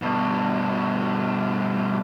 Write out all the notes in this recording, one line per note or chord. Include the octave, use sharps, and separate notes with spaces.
G2 B2